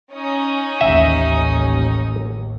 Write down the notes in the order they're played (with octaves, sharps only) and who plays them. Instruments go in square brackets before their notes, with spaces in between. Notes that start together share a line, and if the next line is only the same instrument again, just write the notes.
[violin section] C#4 D#4 D#6
[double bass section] A1 D#2 A2 [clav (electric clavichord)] E5